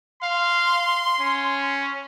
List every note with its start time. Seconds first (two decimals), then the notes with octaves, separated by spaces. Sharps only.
0.23 F5 C6
1.20 C#4